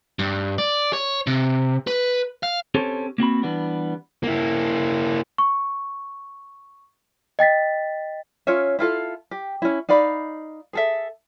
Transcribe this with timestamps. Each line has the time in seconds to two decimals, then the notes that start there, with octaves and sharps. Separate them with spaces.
0.19 G2
0.58 D5
0.93 C#5
1.27 C3
1.87 B4
2.43 F5
2.74 C4 C#4 G4 A4 C5 C#5
3.18 A#3 C4 F#4 B5
3.43 E3 G3 B3 D4
4.23 A#3 E4
5.38 C#6
7.39 D#5 G5 A6 B6
8.47 C#4 F4 C#5 E5
8.79 E4 F4 A4 F5
9.31 G4
9.62 C#4 E4
9.89 D#4 D5 F5 B5
10.73 G#4 A4 E5